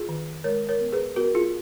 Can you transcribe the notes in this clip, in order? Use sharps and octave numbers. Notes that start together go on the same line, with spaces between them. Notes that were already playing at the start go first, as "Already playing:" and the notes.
Already playing: F4 G#4
D#3
G#3 A#4 C#5
A#4 C#5
B3
G#4 B4
B3 F#4 A#4
F4 G#4